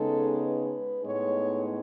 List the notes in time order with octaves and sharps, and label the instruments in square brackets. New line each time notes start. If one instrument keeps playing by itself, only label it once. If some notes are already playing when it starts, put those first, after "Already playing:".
Already playing: [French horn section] C#3 G#3 B3 D#4 A4
B4
A2 G#3 B3 D#4 C#5